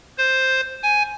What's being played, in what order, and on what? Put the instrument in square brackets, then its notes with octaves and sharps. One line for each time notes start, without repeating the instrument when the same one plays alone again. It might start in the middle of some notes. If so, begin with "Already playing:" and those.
[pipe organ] C5
G#5